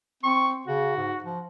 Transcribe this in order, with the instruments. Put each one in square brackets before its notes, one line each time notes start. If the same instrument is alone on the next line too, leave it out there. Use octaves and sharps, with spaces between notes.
[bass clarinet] C4 [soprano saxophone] C#6
[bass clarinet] C#3 [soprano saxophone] F#4
[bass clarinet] G#2
F3